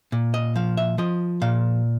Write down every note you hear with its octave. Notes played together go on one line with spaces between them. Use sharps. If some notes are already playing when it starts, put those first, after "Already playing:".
A#2
D#5
F3 F5
E5
F3 D#5
A#2 F5